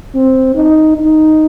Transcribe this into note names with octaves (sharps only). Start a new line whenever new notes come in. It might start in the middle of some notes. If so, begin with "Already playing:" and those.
C4
D#4
D#4